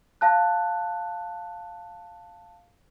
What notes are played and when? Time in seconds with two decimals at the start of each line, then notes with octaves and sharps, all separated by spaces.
0.21 F5 A5 F#6